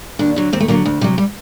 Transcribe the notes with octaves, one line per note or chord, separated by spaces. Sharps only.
D#2 D4
D3 F#3
D#2 C4
A3
D3 F#3 A#3
D2
C3 F#3 G3
G3